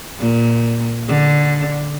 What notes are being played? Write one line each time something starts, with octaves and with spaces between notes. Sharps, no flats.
A#2
D3